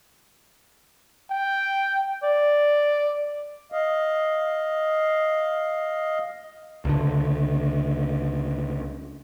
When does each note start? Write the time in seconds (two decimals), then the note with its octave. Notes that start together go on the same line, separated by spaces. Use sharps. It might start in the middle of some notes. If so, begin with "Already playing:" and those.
1.30 G5
2.23 D5
3.72 D#5 F5
6.85 C#2 D3